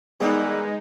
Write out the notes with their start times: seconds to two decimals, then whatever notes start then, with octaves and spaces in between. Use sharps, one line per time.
0.20 D#3 E3 G3 G#3 B3 D#4 G#4